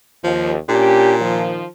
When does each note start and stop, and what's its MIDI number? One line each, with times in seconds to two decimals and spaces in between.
0.24 0.56 39
0.24 0.53 53
0.69 1.57 46
0.69 1.15 61
0.69 1.15 62
0.69 1.15 67
1.20 1.65 51
1.20 1.65 53